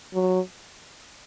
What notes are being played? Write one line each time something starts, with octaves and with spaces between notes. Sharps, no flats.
F#3